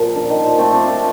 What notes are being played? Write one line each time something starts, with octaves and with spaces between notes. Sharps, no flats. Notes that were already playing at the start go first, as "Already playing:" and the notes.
Already playing: A#2 F3
D3
D#3
F3
A3 C4
D4 F4
F3 A3